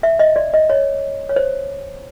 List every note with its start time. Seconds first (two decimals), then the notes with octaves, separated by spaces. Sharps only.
0.03 E5
0.19 D#5
0.36 D5
0.54 D#5
0.70 C#5
1.29 C#5
1.36 C5